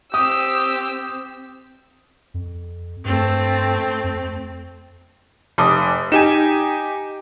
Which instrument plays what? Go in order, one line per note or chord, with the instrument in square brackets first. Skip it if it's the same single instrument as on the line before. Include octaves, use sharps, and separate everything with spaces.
[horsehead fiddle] C4 [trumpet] G4 [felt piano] D#6 [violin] E6
[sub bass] F2
[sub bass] G2 [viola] A3 C4
[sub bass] F2
[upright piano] F1 D6 D#6
[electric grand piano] D#4 G4 G#5 [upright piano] E7